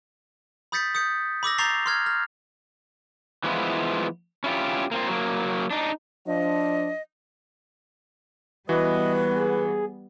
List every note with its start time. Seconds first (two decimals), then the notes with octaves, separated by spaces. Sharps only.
0.72 B5 D#6 G6 A6 B6 C#7
0.95 D#6 G6 C#7
1.43 B5 D6 E6 A#6
1.58 A#5 C#6 G6 A6 C7 F7
1.86 C6 F6 G#6
2.06 F6
3.44 E3 F3 G#3 B3 E4 F4
4.44 C#4 E4 F4 G4
4.91 A#3 C4 F4
5.07 F#3 A#3
5.71 D4 D#4
6.27 F3 D4 D#5
8.69 E3 G3 B3 F#4 B4 D#5
9.34 G#4